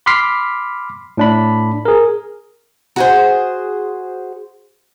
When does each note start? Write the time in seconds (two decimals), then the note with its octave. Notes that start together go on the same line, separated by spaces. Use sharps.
0.06 B5 C6 D6 F6 B6 C7
1.17 A2 D4 B5
1.85 G#4 A#4
2.96 F#4 G#4 C5